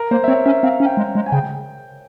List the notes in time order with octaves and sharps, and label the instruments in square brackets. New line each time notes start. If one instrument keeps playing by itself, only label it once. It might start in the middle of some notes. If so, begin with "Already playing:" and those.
Already playing: [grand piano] A#4
[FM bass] A#3 [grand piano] C5
[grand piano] E5
[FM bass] C4 [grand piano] C#5
[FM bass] C#4 [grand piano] E5
[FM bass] C4 [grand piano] F5
[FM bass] C#4
[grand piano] G5
[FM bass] G#3
G#3
[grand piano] G#5
[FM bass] C#3 [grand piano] G5